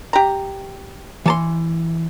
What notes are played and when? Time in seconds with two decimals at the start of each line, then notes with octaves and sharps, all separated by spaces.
0.13 G4 A#5
1.26 E3 A5 C6